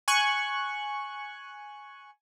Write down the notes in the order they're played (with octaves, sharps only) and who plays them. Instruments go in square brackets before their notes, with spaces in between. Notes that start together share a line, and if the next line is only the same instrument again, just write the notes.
[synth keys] G#5 C#6 F#6